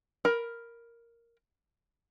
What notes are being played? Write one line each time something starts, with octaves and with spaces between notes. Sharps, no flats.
A#4 B5